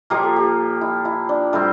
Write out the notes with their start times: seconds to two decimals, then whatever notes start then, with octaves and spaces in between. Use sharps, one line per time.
0.10 A#2 F3 A#3 G4
0.23 A4
0.36 G4
0.81 E4
1.05 E4
1.29 D4
1.53 A2 G3 C4 D4